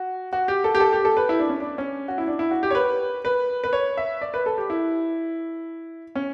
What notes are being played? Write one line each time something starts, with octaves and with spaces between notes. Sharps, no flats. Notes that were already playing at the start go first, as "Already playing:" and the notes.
Already playing: F#4
F#4
G4
A4
G4
A4
G4
A4
B4
E4
D4
C#4
D4
C#4
F#4
E4
D4
E4
F#4
G4
C#5
B4
B4
B4
C#5
E5
D5
B4
A4
G4
E4
C#4